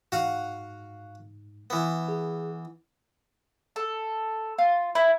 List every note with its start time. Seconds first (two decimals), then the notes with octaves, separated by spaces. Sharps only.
0.12 G#2 F#4 F5 F#5
1.70 E3 B3
2.08 G#4
3.76 A4
4.58 F4
4.95 E4